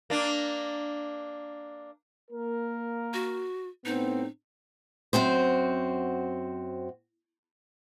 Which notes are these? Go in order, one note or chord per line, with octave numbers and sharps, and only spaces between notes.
A#3 D4
A#3 A#4
F#4
A2 B3 C4 D#4
F#2 C4 F#4 C5